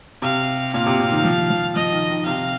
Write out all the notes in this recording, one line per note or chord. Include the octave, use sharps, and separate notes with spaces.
C3 F5
A#2 F5
C3
C3
D#3
F3
F3
F3 D#5
D#3
D#3
C3 F5